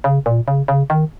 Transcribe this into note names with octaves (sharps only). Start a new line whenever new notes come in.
C#3
A#2
C#3
C#3
D#3